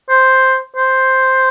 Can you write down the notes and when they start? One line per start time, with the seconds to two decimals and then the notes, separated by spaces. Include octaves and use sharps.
0.09 C5
0.76 C5